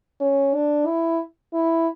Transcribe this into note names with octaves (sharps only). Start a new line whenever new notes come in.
C#4
D4
E4
E4